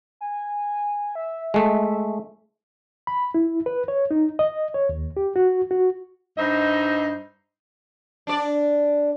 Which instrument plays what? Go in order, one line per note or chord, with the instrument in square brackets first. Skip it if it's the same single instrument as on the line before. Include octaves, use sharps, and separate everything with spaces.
[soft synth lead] G#5
E5
[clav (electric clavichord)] G#3 A3
[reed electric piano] B5
E4
B4
C#5
D#4
D#5
C#5
D#2
G4
F#4
F#4
[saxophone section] G2 D#4 C5 D#5 E5
[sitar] D4 D5